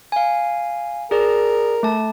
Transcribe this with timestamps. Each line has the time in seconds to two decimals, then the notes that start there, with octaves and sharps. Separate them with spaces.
0.12 F5 G#5
1.11 G#4 A#4 D5
1.83 A3 A5